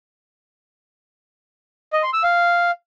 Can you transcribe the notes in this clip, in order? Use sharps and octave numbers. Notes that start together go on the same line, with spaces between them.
D#5
C6
E6
F5